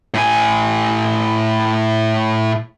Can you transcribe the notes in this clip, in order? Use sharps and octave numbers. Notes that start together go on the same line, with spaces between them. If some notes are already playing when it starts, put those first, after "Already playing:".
A2 G#5